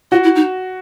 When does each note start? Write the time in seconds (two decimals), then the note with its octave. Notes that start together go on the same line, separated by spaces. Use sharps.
0.12 F4 F#4
0.23 E4
0.36 D#4